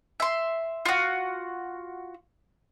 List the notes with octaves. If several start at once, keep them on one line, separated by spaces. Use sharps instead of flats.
E5 C6
F4 F#4